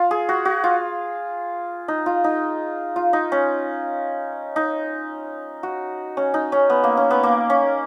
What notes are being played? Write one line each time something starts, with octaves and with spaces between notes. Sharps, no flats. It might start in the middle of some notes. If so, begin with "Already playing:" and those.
Already playing: F4
G#4
F#4
F#4
F4
D#4
F4
D#4
F4
D#4
C#4
D#4
F#4
C#4
D#4
C#4
B3
A#3
C#4
B3
A#3
C#4